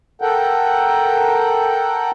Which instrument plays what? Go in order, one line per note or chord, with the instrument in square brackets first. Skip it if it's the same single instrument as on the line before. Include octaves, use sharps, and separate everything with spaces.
[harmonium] A4 A#4 F#5 G5